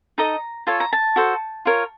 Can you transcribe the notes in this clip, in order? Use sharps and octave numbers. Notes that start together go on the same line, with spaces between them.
D#4 A4 D#5 A#5
F4 A4 C#5 A5
A#5
A5
F#4 A4 C5
F4 A#4 C#5